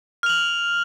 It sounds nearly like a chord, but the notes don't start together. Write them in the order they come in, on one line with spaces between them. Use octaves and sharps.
F6 F7 F#7